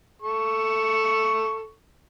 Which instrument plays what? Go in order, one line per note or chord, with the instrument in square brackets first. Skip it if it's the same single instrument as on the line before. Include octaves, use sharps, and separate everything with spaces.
[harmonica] A4 C#6